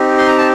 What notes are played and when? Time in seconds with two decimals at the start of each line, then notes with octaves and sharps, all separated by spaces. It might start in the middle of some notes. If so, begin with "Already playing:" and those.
Already playing: C4 D#4 G4
0.18 C6
0.28 A#5
0.38 A5